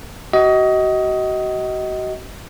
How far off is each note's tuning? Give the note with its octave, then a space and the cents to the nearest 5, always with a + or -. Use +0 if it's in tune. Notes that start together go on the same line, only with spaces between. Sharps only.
F#4 +35 D#5 +20